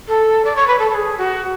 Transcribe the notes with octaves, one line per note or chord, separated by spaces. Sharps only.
A4
D5
C#5
B4
A4
A4
G#4
F#4